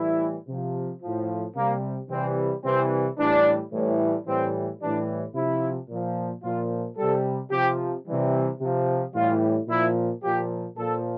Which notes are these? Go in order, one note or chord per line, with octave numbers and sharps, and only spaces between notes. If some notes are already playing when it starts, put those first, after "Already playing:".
Already playing: A2 E3 G3 E4
C3 F3
A2 F3
C3 G3 A#3
C3 E3 G3 C4
C3 E3 G3 C4
A2 E3 G3 D4
A2 E3 G3
A2 E3 G3 C4
A2 E3 G3 D4
C3 F3 E4
A#2 F3
A#2 F3 F4
C3 G3 A4
C3 F3 G4
C3 E3 G3
C3 F3
A2 E3 G3 F4
A#2 F3 E4
A#2 F3 G4
A#2 F3 A4